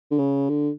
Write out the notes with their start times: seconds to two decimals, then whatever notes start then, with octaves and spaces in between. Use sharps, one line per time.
0.11 D3
0.19 C#3
0.49 D3